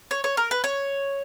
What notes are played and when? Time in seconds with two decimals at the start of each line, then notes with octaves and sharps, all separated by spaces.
0.11 C#5
0.24 C#5
0.37 A#4
0.51 B4
0.64 C#5